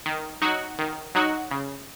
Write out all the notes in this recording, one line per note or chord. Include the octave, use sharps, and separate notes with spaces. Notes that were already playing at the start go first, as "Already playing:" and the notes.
D#3
F#3 D#4 F#4
D#3
F#3 D#4 F#4
C#3